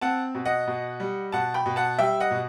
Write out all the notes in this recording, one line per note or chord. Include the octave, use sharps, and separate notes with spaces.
C4 F#5 A5
B2
D#5 F#5
B2
G3
B2 F#5 A5
G5 B5
B2
F#5 A5
G3 E5 G5
D#5 F#5
B2